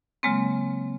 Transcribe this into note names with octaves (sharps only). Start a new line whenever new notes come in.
C#3 F#3 G#3 A#3 C4